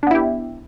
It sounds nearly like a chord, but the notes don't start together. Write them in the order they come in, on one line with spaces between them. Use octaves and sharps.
D4 B3 E4 G4